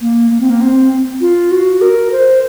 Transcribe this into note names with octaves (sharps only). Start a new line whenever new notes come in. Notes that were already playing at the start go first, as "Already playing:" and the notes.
A#3
A#3
C4
A#3
C4
F4
F#4
A#4
C5